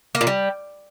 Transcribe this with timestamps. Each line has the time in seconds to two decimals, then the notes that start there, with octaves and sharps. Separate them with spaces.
0.15 A#3
0.21 A#2
0.27 G3